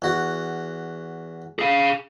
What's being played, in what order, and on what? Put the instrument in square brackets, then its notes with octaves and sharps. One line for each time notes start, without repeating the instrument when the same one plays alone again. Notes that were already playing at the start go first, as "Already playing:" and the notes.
[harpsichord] E2 F#4
[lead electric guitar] G#4 F5